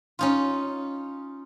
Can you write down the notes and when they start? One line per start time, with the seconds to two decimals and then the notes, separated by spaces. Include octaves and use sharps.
0.19 C#4 D#4 F4